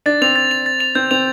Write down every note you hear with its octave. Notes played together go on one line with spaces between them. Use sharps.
D4 A6
C4 F7
A6
F7
A6
F7
C4 G6
C4 F7